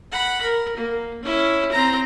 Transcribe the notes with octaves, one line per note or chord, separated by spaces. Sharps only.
F#5 B5
A#4
A#3
C#4 E4
C4 A#5